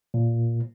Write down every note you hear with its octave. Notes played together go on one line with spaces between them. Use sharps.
A#2